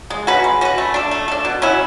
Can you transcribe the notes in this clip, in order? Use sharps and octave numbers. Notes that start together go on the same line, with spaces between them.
G#3
C#4 F#4 B4
G#3
C#4 F#4 B4
A3
D4 A4
A3
D4 A4
B2
F#3 C#4 E4